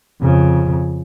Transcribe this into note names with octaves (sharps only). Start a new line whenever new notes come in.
F2 C#3